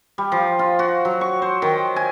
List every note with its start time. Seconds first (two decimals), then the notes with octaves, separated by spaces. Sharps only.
0.18 G3
0.32 F3
0.59 F4
0.79 F#4
1.05 F#3
1.21 C#6
1.42 C5
1.62 D#3
1.96 G#5